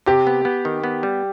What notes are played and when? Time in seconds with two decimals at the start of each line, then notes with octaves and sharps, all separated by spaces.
0.06 C3 G4
0.27 B3
0.45 B3
0.65 D#3
0.84 B3
1.03 G3